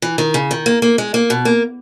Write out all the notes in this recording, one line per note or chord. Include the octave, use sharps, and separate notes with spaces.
E3
D#3
C#3
D#3
A#3
A#3
G#3
A#3
B2
A#3